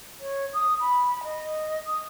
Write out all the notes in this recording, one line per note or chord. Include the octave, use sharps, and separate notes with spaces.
C#5
D#6
B5
D#5
D#6